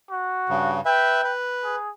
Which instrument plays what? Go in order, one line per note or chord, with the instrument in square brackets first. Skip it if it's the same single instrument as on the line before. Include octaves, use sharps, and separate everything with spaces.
[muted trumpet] F#4
[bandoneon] G2 C#3
[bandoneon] B4 E5 [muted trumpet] G5
[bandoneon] B4
[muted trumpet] G#4